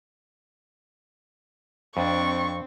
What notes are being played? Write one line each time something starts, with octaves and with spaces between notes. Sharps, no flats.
F2 C4 D4 C#6